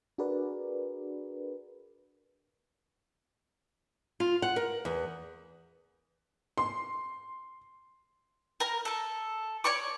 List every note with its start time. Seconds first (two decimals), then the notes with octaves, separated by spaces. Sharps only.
0.18 D4 F#4 G#4 A#4 B4 D5
4.20 F4
4.42 F#5
4.56 A#4
4.85 E2
6.58 C6
8.60 A#4 A#5
8.85 A4 A5
9.64 C#5 D5 C#6 D6